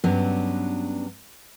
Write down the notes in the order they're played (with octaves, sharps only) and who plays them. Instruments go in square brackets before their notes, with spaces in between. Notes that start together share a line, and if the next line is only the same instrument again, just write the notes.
[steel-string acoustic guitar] G2 F#3 B3 C#4 D4